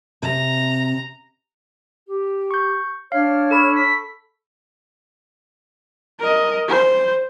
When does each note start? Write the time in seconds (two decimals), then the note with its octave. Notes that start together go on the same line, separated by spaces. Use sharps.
0.22 C3 A#5
2.07 G4
2.51 C#6 G6
3.12 D4 C#5 F5 F6
3.51 A4 B5 C#6 E7
3.75 B6
6.20 A#4 D#5
6.68 C5